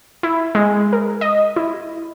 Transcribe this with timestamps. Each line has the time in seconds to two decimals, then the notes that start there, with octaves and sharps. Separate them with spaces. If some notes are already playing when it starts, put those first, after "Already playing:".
0.23 E4
0.55 G#3
0.93 A#4
1.21 D#5
1.56 E4